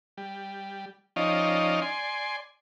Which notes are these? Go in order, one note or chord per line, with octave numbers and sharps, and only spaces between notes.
G3
F3 C#4 D#4 D5 D#5 F5
D5 G#5 C6